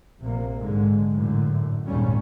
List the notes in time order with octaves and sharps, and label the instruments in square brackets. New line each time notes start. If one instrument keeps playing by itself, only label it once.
[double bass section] A#1 C3 A#3
G#2 D3 G#3
F#2 A2 D3
G#1 D#2 A#2 G3 C#4